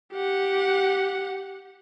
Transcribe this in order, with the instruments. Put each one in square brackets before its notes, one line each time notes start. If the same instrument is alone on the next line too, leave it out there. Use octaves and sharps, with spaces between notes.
[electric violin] G4 F#5